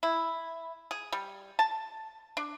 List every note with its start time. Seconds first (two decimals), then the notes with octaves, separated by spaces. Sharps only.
0.03 E4
0.91 G#4
1.12 G3
1.59 A5
2.37 D4